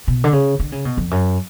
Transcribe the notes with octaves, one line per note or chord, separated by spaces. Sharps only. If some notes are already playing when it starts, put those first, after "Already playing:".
B2
D3
C#3
D3
C#3
B2
F2
F#2